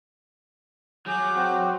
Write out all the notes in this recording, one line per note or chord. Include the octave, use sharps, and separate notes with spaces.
F#3 G#4 D6 G6
C4 F#4